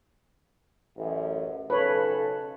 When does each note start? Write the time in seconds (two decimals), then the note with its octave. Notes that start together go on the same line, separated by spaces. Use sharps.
0.97 A1 F#2
1.70 B1 C#3 A4 B4 C#5